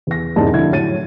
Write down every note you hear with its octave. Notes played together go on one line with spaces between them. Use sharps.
E2 A#6
E1 C2 G#2 D5 A5
F2 D3 E4 G#6
A2 F#3 C#5 A6 D#7